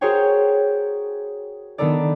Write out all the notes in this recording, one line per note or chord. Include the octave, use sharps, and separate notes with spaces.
F#4 G#4 A#4 C5 C#5 G5
D#3 B3 D4 A4 A#4 D5